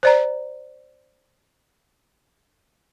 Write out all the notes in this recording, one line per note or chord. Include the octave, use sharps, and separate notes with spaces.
C5 D5 A#5